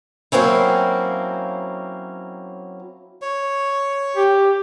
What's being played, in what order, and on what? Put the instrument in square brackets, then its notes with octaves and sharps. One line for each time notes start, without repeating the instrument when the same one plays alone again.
[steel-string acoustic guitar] F#3 A#3 C4 C#4 E4
[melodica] C#5
[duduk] G4